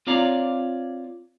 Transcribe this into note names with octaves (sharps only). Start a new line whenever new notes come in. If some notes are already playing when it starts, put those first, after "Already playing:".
C4 F4 C#5 D5 F5 A#5